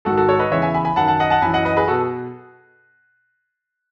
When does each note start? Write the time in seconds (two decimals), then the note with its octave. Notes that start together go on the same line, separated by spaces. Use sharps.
0.05 G#2 F#4 A4
0.10 D#3
0.17 F#4 A4
0.28 A4 C#5
0.39 B4 D#5
0.51 E2 C#3 E3 C#5 E5
0.62 E5 G#5
0.74 G#5 B5
0.85 G#5 B5
0.96 F#2 D#3 F#5 A5
1.08 F#5 A5
1.20 D#5 F#5
1.30 F#5 A5
1.42 F#2 E3 G#5 B5
1.53 D#5 F#5
1.65 B4 D#5
1.77 G#4 B4
1.88 B2 F#4 A4